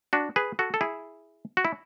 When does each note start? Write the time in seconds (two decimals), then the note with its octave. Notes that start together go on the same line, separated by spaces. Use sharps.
0.13 D4 F#4
0.36 G#4 B4
0.59 F#4 A4
0.74 A4
0.81 E4 G#4
1.57 F#4
1.65 E4